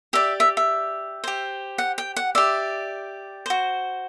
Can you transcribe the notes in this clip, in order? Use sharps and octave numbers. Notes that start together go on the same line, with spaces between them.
G4 D5 E5
E5
E5
G4 C5
F#5
G5
F#5
G4 D5 E5
F#4 C5